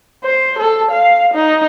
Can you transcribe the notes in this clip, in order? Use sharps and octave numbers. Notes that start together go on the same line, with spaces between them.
C5
A4
F5
D#4